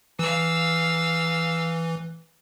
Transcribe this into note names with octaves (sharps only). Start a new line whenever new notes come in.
E3 F5 E6